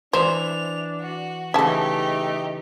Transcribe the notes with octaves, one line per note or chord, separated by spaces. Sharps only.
E3 D4 C5 E5 F7
F#4
C#3 E3 A3 D#4 G4 E5 A5